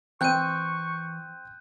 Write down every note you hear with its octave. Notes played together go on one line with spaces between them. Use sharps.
E3 C4 G5 C#6 F#6 G6 D#7